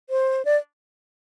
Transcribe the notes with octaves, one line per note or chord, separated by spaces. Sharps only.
C5
D5